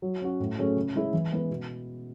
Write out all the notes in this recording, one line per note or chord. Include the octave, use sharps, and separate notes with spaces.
F#3
C#4 F#4
A2
F#3 A3 C#4 G#4
C#3
G#3 C#4 E4 G#4
E3
G#3 B3 E4 B4
B2